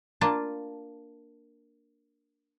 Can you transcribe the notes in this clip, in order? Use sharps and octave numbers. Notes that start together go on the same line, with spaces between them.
A#3 D4 F4 A5